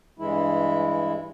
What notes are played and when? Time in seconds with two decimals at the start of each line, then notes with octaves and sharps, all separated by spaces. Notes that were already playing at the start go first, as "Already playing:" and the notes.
0.19 G2 E3 G#3 E4